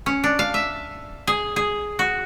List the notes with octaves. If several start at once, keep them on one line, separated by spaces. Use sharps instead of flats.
C#4
D4
F5
E5
G#4
G#4
F#4